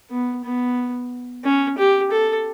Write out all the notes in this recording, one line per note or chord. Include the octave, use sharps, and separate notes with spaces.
B3
B3
C#4
G4
A4